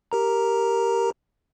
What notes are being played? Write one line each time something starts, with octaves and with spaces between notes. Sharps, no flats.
G4 A#4 A#5